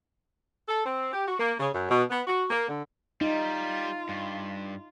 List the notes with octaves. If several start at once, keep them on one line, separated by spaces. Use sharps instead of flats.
A4
C4
G4
F#4
A#3
C#3
F#2
B2
B3
F#4
A#3
D3
G3 D#4 F4
G2